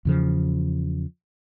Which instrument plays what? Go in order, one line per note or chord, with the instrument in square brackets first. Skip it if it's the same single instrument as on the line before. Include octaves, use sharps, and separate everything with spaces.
[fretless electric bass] E2 C#3 F3